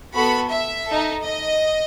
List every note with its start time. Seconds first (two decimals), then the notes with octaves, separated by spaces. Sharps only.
0.14 B3 F#4 A4 B5
0.50 E5
0.86 D#4 A4
1.22 D#5